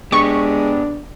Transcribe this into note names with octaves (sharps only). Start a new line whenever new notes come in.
G#3 B3 D4 G4 C#6